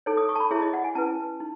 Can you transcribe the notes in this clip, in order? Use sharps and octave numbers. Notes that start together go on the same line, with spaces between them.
D#4 A4 C#5
D#6
C#6
A5
B5
E4 G#4 C#5 E5
D#5
F#5
G#5
C#4 E4 B4 A5
D#4